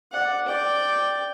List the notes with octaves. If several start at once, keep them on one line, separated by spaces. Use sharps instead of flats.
D5 F#5
D5 G5